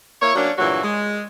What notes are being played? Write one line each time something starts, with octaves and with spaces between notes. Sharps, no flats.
A#3 E4 C#5
F#3 A#3 C#4 D4
G2 A#2 E3 F#3 F#4
G#3